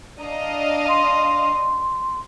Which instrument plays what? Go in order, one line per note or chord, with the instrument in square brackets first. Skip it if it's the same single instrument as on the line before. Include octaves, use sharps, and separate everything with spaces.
[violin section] D4 D#5 F5 [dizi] A#5
[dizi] C6